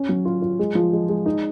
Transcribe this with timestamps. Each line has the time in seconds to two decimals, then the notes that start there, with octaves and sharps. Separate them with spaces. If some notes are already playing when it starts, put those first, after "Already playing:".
Already playing: C#4
0.09 F#3
0.25 F4
0.42 F4
0.59 G#3
0.75 F3
0.93 G#3
1.09 G#3
1.26 D#4